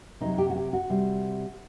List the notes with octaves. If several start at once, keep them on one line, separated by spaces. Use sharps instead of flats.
C3 F#3 D#4
G4
F#4
G4
F#4
C3 G3